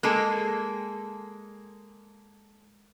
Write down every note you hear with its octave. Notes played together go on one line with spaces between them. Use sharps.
G#3 A#3 G#4 A4